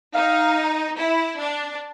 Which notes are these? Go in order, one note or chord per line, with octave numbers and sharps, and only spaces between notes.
D#4 F5
E4
D4